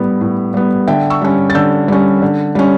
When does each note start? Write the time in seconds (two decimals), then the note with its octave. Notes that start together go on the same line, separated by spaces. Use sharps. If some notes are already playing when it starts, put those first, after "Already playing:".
Already playing: A2 G3 B3 F#5
0.21 A2
0.54 G3 B3
0.88 D3 E5 G5
1.10 C#6 E6
1.22 G3 C#4
1.50 A6
1.55 D3 E6 G6
1.88 G3 C#4
2.22 D3
2.55 G3 C#4